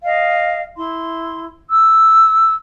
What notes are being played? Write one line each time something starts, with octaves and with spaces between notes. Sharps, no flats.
D#5 F5
E4 C6
E6